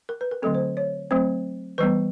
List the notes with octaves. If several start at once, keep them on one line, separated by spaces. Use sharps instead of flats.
A#4
B4
A#4
D3 F#3 A3 C4 A4
C5
C#5
F#3 A3 C4 C5
E3 G3 B3 B4